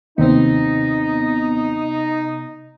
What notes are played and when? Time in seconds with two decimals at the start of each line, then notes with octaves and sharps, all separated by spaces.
0.18 D#2 C3 B3 C4 D#4